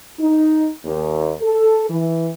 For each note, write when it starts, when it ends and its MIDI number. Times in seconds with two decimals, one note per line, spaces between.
0.19 0.70 63
0.85 1.33 39
1.41 1.89 69
1.90 2.30 52